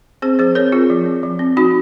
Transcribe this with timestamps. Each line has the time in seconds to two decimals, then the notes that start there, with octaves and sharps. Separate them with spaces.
0.22 C4 G#4 C5
0.39 F3 G#4 C5
0.55 C4 A#4 C#5
0.72 C4 F4 G#4
0.90 F3
1.06 C4
1.23 F3
1.39 C4
1.56 F3 D#4 F#4